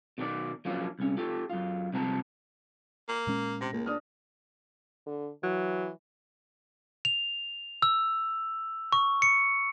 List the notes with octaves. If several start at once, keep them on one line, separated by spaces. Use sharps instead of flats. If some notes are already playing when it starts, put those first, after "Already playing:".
B2 D#3 F#4 D5
F3 F#3 A#3 C#4 D4 F4
C2 C#4
F4 G4 A4
F#2 F4
C2 C3 F3 A5 A#5
A#3
A#2 G#3 C#4
C3 A#6
C#2 A#3
D4 D#6 F6
D3
E3 F#3
F7
E6
C#6
C#7